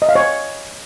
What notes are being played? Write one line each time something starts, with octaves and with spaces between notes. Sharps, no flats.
D#5
F5
C#5